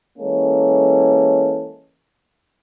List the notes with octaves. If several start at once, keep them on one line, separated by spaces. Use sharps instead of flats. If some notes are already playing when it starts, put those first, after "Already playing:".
E3 G#3 A#3 C#4 A4